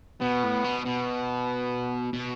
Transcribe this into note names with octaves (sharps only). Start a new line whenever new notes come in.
B2 B3
A2
B2
B2 B3
B2